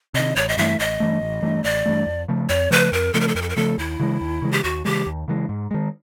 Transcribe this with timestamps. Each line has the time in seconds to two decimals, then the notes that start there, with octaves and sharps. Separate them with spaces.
0.14 C3 D#3 D#5
0.36 A1 C#5
0.49 D#5
0.57 G2 E3 A3 E5
0.79 A1 D#5
1.00 G2 E3 A3
1.21 A1
1.42 G2 E3 A3
1.64 A1 D5
1.86 G2 E3 A3
2.07 F2
2.28 C#3 F3 A3
2.49 F2 C#5
2.71 C#3 F3 A3 B4
2.92 F2 A#4
3.14 C#3 F3 A3 A4
3.21 A#4
3.28 A4
3.35 F2 A#4
3.42 A4
3.49 A#4
3.56 C#3 F3 A3 A4
3.78 D#2 E4
4.00 C#3 E3 G#3
4.21 D#2
4.42 C#3 E3 G#3
4.52 G4
4.64 D#2 F#4
4.85 C#3 E3 G#3 G4
5.06 D#2
5.28 C#3 E3 G#3
5.49 G#2
5.71 D#3 G#3